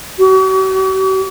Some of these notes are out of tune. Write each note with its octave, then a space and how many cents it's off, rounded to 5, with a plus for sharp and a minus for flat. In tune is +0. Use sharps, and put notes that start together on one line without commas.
F#4 +45